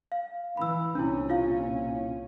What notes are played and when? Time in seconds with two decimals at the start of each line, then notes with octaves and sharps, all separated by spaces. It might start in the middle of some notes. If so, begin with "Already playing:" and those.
0.12 F5
0.57 E3 B5 E6
0.95 C2 A#2 C#4 D4 E4
1.29 E4 F4 F5